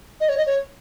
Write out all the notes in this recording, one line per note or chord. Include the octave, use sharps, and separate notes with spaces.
D#5
C#5
D#5
C#5